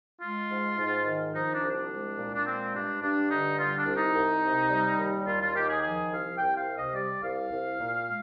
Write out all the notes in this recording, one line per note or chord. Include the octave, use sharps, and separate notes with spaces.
G#3 F4
G#2
G#2
D#3
F3 D#4
D4
C2
D4
G#3
A#2
D4
G#3 C4
G2 D4
G2 D4
D3 D#4
G3 F4
D4
C2
D#4
C2
C3
G3
D#2
D#2 F4
F4
D#3 G4
G#4
F3 G#4
C2 F5
C2 G5
F5
C3
D#5
G3 D5
C2 F5
C2
A#2
G#3